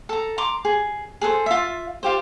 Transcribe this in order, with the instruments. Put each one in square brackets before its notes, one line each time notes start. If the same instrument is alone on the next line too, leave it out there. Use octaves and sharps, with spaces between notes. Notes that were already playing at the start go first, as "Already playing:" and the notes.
[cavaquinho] A4 A#5
A#5 C6 D6
G#4
G#4 A4 B4 C5
F4 E5
F4 G4 C5